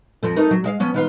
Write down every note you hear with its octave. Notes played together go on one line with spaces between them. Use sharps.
F2 F3 A4
A3 D#4 A#4
F#3
G#3 E5 F5
F3 B3 C#4
D#3 B3 F4